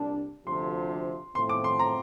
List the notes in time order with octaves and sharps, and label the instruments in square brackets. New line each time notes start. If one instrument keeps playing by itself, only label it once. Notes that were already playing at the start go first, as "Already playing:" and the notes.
Already playing: [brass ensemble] C2 A#2 G3 D4
[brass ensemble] D2 C3 F3 [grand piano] C6
[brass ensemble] A2 F3 A3 C4 [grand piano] C6
[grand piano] D6
C6
A#5